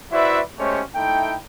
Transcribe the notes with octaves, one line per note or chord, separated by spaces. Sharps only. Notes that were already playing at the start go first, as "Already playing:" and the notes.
E4 F#4 B4 C5 D5 E5
G#3 A3 C#4 G4 C5 C#5
A3 D#4 E4 G5